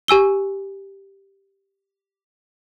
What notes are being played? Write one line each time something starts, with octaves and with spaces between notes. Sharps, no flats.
G4 G#5 E6 G7